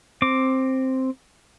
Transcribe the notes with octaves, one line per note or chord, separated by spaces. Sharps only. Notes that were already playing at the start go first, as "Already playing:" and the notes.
C4 D6